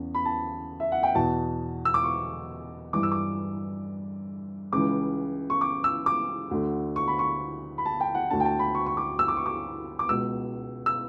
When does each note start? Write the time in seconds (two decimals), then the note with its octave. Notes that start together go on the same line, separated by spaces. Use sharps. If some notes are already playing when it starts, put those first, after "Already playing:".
Already playing: E2 C#3
0.14 B5
0.25 A5
0.80 E5
0.92 F#5
1.03 G5
1.15 E2 B2 A5
1.85 E6
1.94 D6
2.04 C#6
2.93 G2 E3 D6
3.03 E6
3.12 D6
4.72 C#2 C#3 E3 D6
5.50 C#6
5.61 D6
5.84 E6
6.06 D6
6.51 D2 D3
6.96 C#6
7.08 B5
7.19 C#6
7.78 B5
7.85 A5
8.00 G5
8.14 F#5
8.30 D2 D3 A5
8.40 G5
8.45 A5
8.59 B5
8.75 C#6
8.86 C#6
8.97 D6
9.19 E6
9.28 D6
9.37 C#6
9.46 D6
9.99 D6
10.09 C#2 B2 E6
10.86 E6